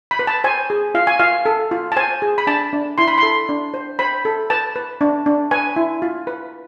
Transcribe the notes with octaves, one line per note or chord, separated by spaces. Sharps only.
B5
B4
A5
C5 G#5
G#4
F4 F5
G#5
F4 F5
A4
F4
A5
C5 G#5
G#4
B5
D4 A5
D4
E4 C6
B5
A4 C6
D4
C5
C5 B5
A4
B4 A5
B4
D4
D4
B4 G#5
E4
F4
B4